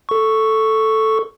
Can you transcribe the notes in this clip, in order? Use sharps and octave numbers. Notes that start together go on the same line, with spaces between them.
A4 C#6